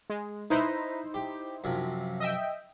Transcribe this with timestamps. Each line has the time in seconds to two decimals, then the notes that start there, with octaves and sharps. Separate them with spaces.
0.10 G#3
0.50 D#4 E4 B4 C5 A#5
1.14 G4
1.64 F#2 C3 F3
2.20 D#5 E5 G5